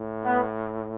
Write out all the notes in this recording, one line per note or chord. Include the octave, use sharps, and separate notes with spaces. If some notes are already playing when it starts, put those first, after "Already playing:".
Already playing: A2
B3